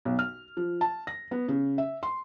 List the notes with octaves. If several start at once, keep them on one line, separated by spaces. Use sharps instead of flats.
B1
F6
F3
A5
A#6
B3
C#3
E5
C6